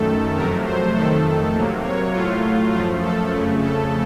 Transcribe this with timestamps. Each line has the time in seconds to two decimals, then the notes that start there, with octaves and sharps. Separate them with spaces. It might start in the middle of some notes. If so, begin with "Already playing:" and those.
Already playing: F#2 D#3 A3 A4
0.35 F2 C3 F#3 A3 A#4
0.65 C5
0.94 F2 D#3 A3 A4
1.54 C3 F#3 A#3
1.83 C#5
2.13 A2 F#3 A3 F4
2.72 F#2 F3 A3 F4
3.02 A4
3.31 F2 C#3 A3
3.62 A4